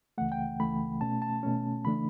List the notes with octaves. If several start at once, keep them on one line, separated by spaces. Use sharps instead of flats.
C#2 C#3 E3 A3 F#5
G5
C#2 C#3 E3 A3 B5
B2 A3 C#4 A5
A5
B2 A3 C#4
C#3 E3 A3 D4 B5